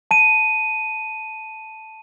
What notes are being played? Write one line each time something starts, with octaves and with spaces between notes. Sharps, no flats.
A5 D#7